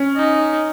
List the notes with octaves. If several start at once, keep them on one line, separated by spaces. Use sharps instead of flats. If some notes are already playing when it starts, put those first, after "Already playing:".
Already playing: C#4
D#4